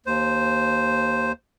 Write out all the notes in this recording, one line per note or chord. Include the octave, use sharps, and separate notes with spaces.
D#2 C5